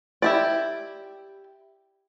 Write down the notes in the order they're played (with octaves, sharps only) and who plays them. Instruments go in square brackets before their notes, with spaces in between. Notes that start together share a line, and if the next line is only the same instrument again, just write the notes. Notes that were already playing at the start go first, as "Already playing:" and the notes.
[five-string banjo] E4 G4 D5